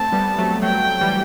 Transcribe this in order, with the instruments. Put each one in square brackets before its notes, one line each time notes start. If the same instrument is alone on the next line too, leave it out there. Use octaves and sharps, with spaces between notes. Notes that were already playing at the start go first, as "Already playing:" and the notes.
Already playing: [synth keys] A3 C4 [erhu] A5
[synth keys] G3 B3
F#3 A3
[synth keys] F#3 A3 [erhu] G5
[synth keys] E3 G3